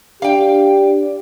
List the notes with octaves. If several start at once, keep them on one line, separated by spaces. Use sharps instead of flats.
D4 G4 D5 F5 G5